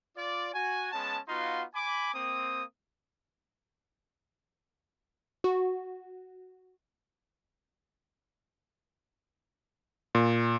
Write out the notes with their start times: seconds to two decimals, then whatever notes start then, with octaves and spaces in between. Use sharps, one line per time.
0.17 F4 D5
0.54 F#4 G#5
0.92 G#3 B3 C#4 A5
1.29 B3 D#4 F4 F#4 F5 C6
1.75 G#5 B5 D6
2.15 A#3 C4 D#6
5.44 F#4
10.15 A#2